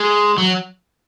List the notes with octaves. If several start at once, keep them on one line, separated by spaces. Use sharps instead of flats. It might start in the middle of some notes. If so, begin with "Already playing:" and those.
Already playing: G#3
F#3